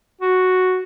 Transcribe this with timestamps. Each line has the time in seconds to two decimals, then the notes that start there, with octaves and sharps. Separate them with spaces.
0.21 F#4